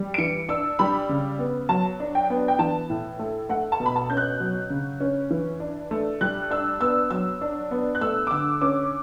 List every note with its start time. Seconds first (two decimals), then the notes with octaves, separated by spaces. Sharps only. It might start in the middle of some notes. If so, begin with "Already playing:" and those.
Already playing: G3
0.14 D7
0.18 E3 C#7
0.49 D4 E6
0.79 G3 B5
1.09 C#3
1.39 B3
1.69 F#3 A5
2.00 D4
2.15 G5
2.30 B3
2.48 G5
2.59 E3 A5
2.90 A2
3.19 A3
3.49 A3 F#5
3.72 A5
3.80 B2
3.86 B5
3.96 A5
4.10 C#4 G6
4.17 F#6
4.40 F#3
4.70 C#3
5.00 C#4
5.31 E3
5.60 D4
5.91 A3
6.21 G3 F#6
6.50 D4 E6
6.81 B3 E6
7.11 F#3 E6
7.41 D4
7.71 B3
7.95 F#6
8.01 A3 E6
8.27 D6
8.31 D3 E6
8.61 C#4 D6